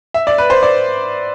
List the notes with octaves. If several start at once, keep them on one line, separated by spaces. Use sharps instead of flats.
E5
D5
B4
C5
D5